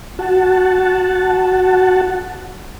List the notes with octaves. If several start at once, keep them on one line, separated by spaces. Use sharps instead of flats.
F#4 F#5 A5